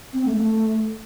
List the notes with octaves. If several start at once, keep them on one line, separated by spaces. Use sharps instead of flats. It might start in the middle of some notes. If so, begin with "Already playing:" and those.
C4
A3
A3